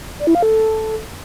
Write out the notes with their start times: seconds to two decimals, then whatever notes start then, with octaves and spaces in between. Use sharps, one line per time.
0.19 D5
0.27 E4
0.35 F5
0.42 A4